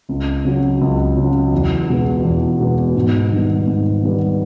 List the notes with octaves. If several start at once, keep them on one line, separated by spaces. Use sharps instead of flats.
C#2
C#3 F#3
C#2
C#3 F#3
E2
B2 G#3 B3
E2
B2 G#3 B3
G#2
D#3 G3 B3
G#2
D#3 G3 B3